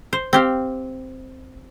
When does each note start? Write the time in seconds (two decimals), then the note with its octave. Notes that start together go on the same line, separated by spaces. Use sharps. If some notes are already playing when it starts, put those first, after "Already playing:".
0.13 C5
0.33 C4 G4 F5